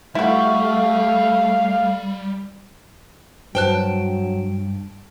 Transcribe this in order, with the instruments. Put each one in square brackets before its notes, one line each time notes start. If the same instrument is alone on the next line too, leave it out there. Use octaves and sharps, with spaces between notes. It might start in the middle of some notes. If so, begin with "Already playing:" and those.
[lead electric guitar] G3 [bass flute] A3 [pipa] E4 F#4 [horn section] F5
[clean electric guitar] G2 [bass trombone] F#3 [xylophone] B4 C5 F#6 [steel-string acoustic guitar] G5 A5